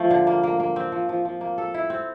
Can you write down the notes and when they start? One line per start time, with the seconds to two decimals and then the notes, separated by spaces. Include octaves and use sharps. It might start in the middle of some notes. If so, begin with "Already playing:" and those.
Already playing: F3 A3 A#3
0.10 D3
0.27 A#3
0.43 A#3
0.60 A#3
0.76 C4
0.92 F3
1.09 F3
1.25 F3
1.41 A#3
1.58 A4
1.74 E4
1.90 C4